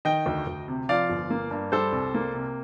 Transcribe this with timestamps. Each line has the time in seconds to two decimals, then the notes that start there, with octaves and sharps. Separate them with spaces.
0.05 D#3 D#5 G5
0.26 D2
0.47 D2
0.68 C3
0.89 F3 D5 F5
1.10 G1
1.30 A#3
1.51 G2
1.72 G3 A4 C5
1.92 C2
2.14 A#3
2.34 C3